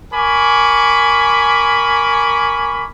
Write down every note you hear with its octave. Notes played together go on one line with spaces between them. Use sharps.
A#4 G#5 B5 C#6 D6